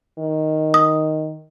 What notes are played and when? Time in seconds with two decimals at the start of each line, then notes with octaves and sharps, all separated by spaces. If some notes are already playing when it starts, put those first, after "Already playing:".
0.19 D#3
0.74 D#6